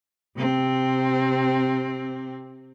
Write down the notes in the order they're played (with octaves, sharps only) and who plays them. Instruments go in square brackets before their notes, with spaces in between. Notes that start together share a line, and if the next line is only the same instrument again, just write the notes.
[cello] C3 C4